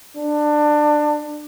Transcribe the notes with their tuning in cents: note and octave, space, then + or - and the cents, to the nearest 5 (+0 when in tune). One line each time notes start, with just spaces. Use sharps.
D4 +20